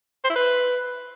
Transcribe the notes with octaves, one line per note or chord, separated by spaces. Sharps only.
C5
E4
B4